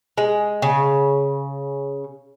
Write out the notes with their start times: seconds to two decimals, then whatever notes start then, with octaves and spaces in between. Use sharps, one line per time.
0.18 G#3
0.62 C#3